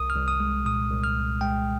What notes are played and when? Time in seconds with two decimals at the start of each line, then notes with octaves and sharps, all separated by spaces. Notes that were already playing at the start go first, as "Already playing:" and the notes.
Already playing: C2 D#6
0.10 F6
0.15 C2
0.28 D#6
0.40 G#3
0.65 A#2 D#6
0.91 C2
1.04 F6
1.16 C2
1.41 G#3 G5